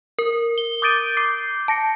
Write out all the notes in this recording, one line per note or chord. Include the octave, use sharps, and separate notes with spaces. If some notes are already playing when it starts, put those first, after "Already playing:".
A#4
G7
D6 D#6 G6 A6 D7 D#7
D6 G6 C7
A5 A#6 C#7